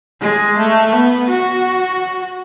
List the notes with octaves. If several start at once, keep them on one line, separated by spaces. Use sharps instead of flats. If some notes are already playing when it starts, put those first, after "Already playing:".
G#3
A3
B3
F#4